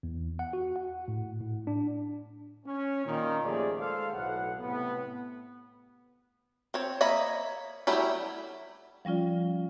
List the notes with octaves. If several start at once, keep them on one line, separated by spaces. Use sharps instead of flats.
E2
F#5
F#4
F#5
A2
A2
D4
C#4
A#2 D#3
D#2 F3 A3 G#4 D5
G#3 A4 C5 F5
B1 A2 F#5
A2 C3 B3
C4 C#5
A#3 C#5 D#5 E5 B5
F#3 G3 A3 E4
F3 G3 C#4 F4 D5